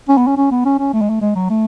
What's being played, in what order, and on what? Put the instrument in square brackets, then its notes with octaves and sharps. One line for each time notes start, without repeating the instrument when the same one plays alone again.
[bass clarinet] C#4
B3
C#4
C#4
B3
C#4
C#4
A3
G#3
A3
G#3
F#3
A3